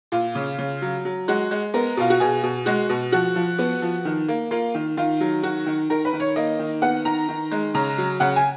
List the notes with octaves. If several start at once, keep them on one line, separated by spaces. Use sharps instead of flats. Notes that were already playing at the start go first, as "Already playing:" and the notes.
A#2 F4
C#3
C#3
F#3
F#3
G#3 F#4
G#3
B3 A#4
B2 F4
F#4
B2 G#4
B2
G#3 F#4
B2
F3 F#4
F3
B3
F3
D#3
A#3
A#3 F4
D#3
D#3 F4
F#3
D#3 F#4
D#3
D#3 A#4
B4
D#3
C#5
A#3 D#5
D#3
B3 F#5
D#3 A#5
D#3
G#3
C#3 A#5
F#3
C#3 F#5
G#5